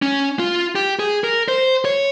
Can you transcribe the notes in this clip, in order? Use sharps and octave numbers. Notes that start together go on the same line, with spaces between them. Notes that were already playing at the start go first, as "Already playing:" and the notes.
C#4
F4
G4
G#4
A#4
C5
C#5